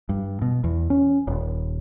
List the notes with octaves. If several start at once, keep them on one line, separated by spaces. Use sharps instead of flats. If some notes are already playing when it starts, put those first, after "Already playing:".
G2
B2
E2
C#4
D#1